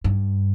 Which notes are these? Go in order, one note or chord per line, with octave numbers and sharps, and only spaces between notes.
G2